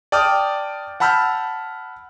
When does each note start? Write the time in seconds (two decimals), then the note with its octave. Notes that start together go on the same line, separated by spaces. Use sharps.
0.12 D5 G5 A5 D6 D#6 F6
1.00 F#5 A5 B5 E6 F6 G6